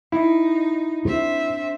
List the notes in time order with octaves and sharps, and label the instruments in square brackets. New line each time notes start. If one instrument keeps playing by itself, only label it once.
[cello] D#4 [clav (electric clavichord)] E4
[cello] C4 E5 [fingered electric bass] D4